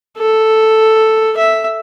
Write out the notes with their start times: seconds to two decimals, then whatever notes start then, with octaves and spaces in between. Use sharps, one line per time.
0.17 A4
1.37 E5